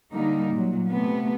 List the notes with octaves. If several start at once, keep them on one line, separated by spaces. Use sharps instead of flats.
D3 G3 A#3 D#4
A#2 F#3
C3 A3 B3